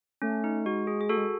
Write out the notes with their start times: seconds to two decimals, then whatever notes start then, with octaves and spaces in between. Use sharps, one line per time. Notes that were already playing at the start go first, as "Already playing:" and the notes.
0.22 A3 C#4
0.44 D#4
0.65 G#3 F#4
0.87 G#4
1.01 G#4
1.09 A3 F#4 A4
1.17 G#3